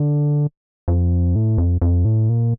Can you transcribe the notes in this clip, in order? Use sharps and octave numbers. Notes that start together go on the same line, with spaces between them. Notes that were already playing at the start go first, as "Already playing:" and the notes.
Already playing: D3
F2
A2
F2
F2
A2
A#2